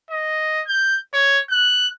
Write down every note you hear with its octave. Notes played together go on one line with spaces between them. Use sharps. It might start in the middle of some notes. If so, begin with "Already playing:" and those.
D#5
G6
C#5
F#6